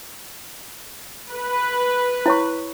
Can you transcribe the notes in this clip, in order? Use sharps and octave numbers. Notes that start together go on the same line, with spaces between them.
B4
E4 C#5 C#6